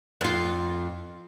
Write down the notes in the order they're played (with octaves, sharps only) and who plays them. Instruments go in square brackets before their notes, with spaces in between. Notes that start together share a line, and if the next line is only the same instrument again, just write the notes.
[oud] F2 F4